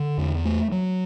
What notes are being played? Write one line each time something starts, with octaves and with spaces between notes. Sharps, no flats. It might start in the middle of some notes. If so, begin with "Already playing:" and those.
Already playing: D3
E2
A3
F#3